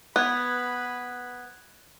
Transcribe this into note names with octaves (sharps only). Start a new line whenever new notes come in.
B3 B4 B5 F#6 G#6